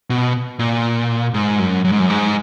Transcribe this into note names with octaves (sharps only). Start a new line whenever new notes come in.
B2
A#2
G#2
F#2
F#2
G#2
F#2
G#2